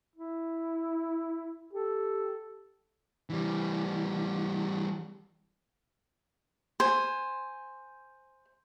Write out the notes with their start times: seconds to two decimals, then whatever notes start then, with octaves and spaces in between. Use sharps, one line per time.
0.16 E4
1.74 G4 A4
3.30 E3 G3
6.80 C5 G#5